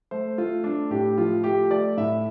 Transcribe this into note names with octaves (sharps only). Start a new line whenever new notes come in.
A3 C5
A3 F4
A3 D4
A2 G4
F3 F4
A3 G4
A3 D5
A2 E5